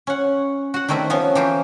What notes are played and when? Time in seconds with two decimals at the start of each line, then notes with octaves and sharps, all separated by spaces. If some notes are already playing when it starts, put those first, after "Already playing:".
0.07 C#4 F#5
0.74 F#4 F#5
0.88 D#3 G3 A3 C4 E4
1.10 F3 B3 C#4
1.35 E3 A#3 G4 C5